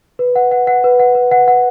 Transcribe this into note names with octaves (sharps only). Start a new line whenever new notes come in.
B4
F#5
F#5
F#5
B4
F#5
B4
F#5
F#5